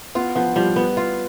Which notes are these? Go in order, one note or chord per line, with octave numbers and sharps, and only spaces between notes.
B3 F4
F3 B3
F3 G3
B3
F4